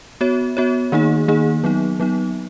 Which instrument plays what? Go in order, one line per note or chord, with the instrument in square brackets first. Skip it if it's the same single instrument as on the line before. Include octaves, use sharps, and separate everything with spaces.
[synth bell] B3 F#4 C#5
B3 F#4 C#5
D#3 A#3 D#4 G#4
D#3 A#3 D#4 G#4
F#3 B3 D#4
F#3 B3 D#4